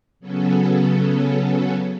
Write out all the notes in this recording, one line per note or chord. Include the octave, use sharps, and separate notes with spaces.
C#3 F#3 B3 C#4 A4